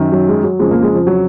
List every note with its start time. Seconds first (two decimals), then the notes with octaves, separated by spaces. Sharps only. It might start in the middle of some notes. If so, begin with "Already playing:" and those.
Already playing: F#2 D#3
0.12 F#3
0.28 G#3
0.43 F#3
0.59 F2 C#3 G#3
0.71 A#3
0.83 G#3
0.95 F3
1.07 F#3